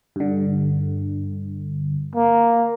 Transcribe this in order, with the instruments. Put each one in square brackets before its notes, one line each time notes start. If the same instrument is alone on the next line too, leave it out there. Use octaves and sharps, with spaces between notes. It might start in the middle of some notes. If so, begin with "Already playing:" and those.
[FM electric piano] G2 D3
[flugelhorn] A#3